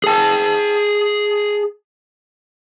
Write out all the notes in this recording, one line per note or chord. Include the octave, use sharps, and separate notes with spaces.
G#4 A5